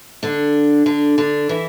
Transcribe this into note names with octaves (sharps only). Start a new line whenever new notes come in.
D3 D4
D3 D4
D3 D4
E3 E4